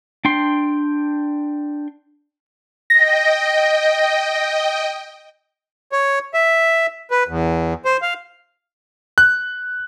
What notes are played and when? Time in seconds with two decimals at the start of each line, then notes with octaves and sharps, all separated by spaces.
0.25 D4 G5 C6
2.90 D#5 G5 A#6
5.92 C#5
6.34 E5
7.11 B4
7.28 E2
7.85 C5
8.02 F5
9.18 F#6